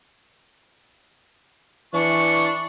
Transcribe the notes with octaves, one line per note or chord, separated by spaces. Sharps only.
E3 D4 C#6